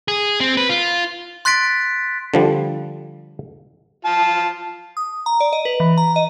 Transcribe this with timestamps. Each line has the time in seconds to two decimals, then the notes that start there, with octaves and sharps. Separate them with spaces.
0.08 G#4
0.40 C4
0.57 B4
0.69 F4
1.45 C6 F#6 A6 B6 D7
2.34 D3 F3 G3
4.05 F4 A5
4.97 D#6
5.26 A#5
5.40 D5
5.53 D#5
5.65 B4
5.80 E3
5.97 A#5
6.16 D#5